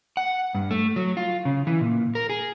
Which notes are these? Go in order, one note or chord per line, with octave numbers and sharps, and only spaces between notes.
F#5
G2
A3
F#3
F4
C#3
E3
A#2
A#4
G#4